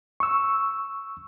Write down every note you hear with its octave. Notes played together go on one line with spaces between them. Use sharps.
C#6 E6